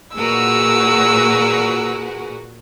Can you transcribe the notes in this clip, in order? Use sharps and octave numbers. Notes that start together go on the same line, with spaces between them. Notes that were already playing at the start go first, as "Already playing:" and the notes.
A#2 F#4 G#4 A#4 B4 E6